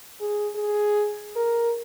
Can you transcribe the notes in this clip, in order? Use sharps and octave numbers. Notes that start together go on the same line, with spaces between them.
G#4
G#4
A#4